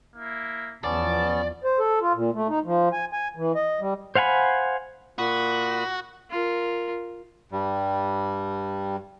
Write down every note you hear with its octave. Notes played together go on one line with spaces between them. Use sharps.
A#3 E4
E2 F3 B3 C#4 D5 A5
C5
A4
F4
A#2
A3
D#4
F3
G#5
G#5
E3
D#5
G3
C5 F5 F#5 G#5 B5
A#2 F#4 B5 D#6
F4 A#4
G2 G3